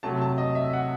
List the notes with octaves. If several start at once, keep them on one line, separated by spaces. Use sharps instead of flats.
C3 F#3 A3 A5
A5
D#5
E5
F#5